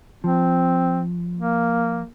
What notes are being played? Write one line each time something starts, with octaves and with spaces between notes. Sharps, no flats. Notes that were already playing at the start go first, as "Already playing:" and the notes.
F3 C4
A#3